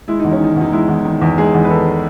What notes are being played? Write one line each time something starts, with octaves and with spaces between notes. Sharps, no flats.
G#3 E4
E2 D#4
C#4
D#3 D#4
E2 D#4
G#3 E4
E2
D#3
E2
G#3 G#4
E2
B4
D#3 A4